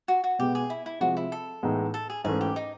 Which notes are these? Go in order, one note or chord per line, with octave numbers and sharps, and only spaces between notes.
F#4
F#4
B2 G#3 B3 G4
G#4
E4
E4
C3 F3 G#3 F#4
E4
A4
A2 E3 G#3 B3 D#4
A4
G#4
G#2 E3 A3 C#4 G#4
G4
D#4